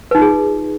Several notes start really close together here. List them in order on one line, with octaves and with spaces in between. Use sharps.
B4 D#4 F4 G#4